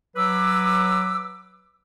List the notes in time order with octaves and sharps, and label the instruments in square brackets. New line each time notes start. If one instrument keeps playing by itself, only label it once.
[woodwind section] F#3 B4 D6 E6